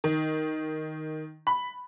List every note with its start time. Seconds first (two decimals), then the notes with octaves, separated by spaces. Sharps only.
0.04 D#3
1.47 B5